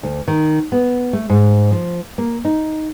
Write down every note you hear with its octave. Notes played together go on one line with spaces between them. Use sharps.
D2
D#3
B3
A3
G#2
F3
A#3
D#4